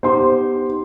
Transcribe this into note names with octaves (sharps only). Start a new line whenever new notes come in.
B3 D#4 G4 C5 C6